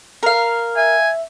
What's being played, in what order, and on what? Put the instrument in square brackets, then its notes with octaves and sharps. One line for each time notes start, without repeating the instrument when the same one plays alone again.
[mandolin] A#4 F5
[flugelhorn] E5 [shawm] G#5